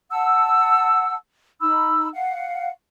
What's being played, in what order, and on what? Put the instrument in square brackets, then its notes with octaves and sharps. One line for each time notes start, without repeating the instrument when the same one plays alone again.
[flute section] F#5 A5 E6
D#4 B5 E6
F5 F#5